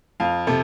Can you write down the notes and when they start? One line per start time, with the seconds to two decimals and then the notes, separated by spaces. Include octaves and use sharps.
0.20 F2 F5
0.47 C3 A4